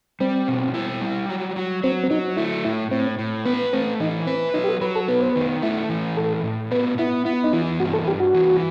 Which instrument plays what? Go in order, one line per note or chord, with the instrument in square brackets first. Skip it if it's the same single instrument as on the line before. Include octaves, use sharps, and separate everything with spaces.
[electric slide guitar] G3 [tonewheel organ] C4
[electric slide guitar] B2
E4
G3
F#3
F#3
[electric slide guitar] F#3 [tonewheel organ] C4
[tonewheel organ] C4
[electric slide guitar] F#3 [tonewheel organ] D#4
[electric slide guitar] A3 [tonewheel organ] E4
[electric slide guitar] A2 [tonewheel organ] E4
[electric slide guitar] A2 [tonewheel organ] C4
[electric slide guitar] A2
[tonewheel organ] B3 [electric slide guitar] B4
[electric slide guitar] A3 [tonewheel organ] C4
[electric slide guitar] E3 [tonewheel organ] D#4
[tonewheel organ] C4 [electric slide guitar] B4
[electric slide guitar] F#3 [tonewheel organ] D#4
[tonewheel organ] G4
A4
[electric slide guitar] F#3 [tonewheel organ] B4
[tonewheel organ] A4
[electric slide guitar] B3 [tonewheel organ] B4
[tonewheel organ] C5
[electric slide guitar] D#3 [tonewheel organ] B4
[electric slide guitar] A3 [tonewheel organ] E4
[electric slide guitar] E3
[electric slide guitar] A2 [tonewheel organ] A4
[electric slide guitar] A2
[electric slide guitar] B3 [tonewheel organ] B4
[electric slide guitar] B3 [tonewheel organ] E4
[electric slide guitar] B3 [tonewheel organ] E4
[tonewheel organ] D#4
[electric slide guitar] E3 [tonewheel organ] E4
[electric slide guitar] G2 [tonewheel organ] F#4
[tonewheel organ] A4
[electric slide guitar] G2 [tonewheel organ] G4
[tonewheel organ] F#4
[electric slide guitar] E3